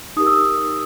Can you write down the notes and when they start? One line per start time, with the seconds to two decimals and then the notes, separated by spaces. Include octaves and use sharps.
0.17 D#4 G4 A#4 D#6
0.27 E6